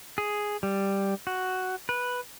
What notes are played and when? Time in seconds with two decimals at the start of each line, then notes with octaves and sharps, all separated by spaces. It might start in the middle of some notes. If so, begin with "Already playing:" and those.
0.18 G#4
0.63 G3
1.27 F#4
1.89 B4